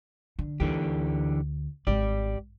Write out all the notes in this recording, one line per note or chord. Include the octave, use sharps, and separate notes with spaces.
D3
D2 D3 E3 G4
G#1 G4 D5